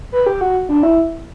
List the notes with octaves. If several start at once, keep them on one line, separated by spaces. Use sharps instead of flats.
B4
G4
F#4
D4
E4